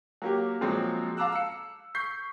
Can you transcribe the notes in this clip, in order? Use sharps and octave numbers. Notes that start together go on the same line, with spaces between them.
F#3 A#3 G4
A#2 F3 F#3 G#3 C4
F5 A5 A#5 D6 E6 F#6
E6 C#7
C#6 G6 B6 C7